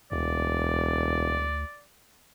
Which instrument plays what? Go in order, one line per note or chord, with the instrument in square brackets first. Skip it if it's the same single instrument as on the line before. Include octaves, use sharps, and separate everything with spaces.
[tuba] E1 [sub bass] D2 [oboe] D5